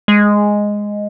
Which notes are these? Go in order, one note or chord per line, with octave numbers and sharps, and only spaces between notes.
G#3